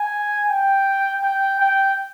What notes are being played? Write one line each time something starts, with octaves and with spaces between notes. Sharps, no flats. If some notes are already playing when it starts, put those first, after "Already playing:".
Already playing: G#5
G5
G5
G5